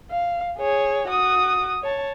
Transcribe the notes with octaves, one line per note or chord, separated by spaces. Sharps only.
F5
G#4 C#5
F#4 D#6
C#5 A5